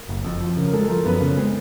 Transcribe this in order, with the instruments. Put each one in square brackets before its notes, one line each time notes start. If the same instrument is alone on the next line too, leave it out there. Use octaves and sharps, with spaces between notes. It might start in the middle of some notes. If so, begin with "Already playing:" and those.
Already playing: [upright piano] A#4
[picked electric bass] F#1
F2
F3
[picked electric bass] C#3 [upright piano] A#4
[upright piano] A#4
[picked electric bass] G#3 [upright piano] A4
[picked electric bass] F3 [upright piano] A#4
[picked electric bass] F#2 [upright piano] B3 B4
[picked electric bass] C#3
[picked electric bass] G#3 [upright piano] C4 C5